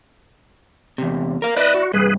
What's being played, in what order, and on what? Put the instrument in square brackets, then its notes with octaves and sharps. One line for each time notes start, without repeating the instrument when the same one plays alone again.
[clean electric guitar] E2 C3
A#4 F5
[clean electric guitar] E4 D5 [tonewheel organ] B4 D#5 F#6
[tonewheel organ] F#4
[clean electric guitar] C2 G2 [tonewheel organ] G#4 B4